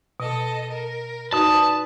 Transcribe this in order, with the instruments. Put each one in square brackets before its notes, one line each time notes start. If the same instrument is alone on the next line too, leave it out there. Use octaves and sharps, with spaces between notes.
[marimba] B2 [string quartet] A4 D#5
[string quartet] A#4
[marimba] D#4 F#4 [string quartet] B4 [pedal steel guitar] D5 D#6 [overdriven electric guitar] A5